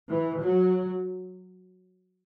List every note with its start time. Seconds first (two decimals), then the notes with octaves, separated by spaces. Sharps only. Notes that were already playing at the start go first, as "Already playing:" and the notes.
0.09 E3
0.42 F#3